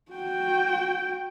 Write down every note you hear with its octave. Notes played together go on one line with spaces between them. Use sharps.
F#4 G5